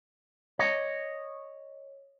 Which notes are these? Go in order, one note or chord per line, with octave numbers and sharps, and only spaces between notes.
C#5 D#5